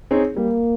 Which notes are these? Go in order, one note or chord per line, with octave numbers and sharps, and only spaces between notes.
C4 D#4 G#4 C#5
G3 A#3